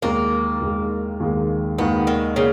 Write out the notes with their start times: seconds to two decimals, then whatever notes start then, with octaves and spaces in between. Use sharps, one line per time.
0.02 D#2 D#3 G#3 A#3
0.61 D#2 D#3 G#3
1.20 D#2 D#3 G#3
1.78 D#2 D#3 G#3 B3
2.07 D#3
2.36 C#3 A#3